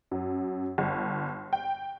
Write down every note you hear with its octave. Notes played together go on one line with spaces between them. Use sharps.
F#2
G1
G5